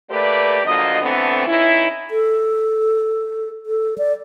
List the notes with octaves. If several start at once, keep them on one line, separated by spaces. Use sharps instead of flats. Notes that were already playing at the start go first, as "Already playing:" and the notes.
A3 A#3 G4 B4 D5
D3 F3 F#3 A#3 D#5
D3 E3 A3 B3 C4
E2 C#4 D#4 E4
A4
A4
D5